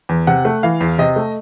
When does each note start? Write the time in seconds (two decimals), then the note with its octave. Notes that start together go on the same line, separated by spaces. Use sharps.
0.09 E2
0.27 C3 F#5
0.45 A3
0.63 E3 F5
0.81 E2
0.98 C3 D#5
1.16 A3